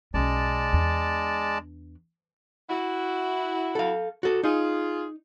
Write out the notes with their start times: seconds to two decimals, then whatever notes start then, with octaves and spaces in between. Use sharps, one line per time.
0.14 B1 G#3 C#4 D5 A5
0.73 E2 D4
2.70 E4 F#4
3.75 A4 F5
4.23 F#4 A4
4.43 D#4 F4 G#4